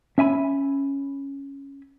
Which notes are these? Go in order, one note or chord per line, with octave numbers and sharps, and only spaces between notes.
C#4 E5 G#5 B5